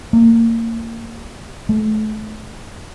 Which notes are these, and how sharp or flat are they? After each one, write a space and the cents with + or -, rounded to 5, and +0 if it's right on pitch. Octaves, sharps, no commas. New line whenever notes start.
A#3 -30
A3 -35